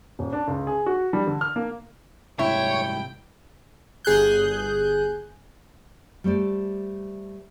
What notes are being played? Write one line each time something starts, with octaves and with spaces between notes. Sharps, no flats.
D#1
D4
C#2
G#4
F#4
G3
D3
F6
A#3
C2 G#2 C3 E4 C#5 G5
G1 G#4 F#6 G6
G3 A3 C5 D5